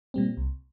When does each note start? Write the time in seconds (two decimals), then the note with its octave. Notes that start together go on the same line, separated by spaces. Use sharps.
0.14 A#2 G3 C4
0.37 C2